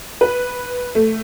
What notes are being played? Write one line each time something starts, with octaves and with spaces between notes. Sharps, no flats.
B4
A3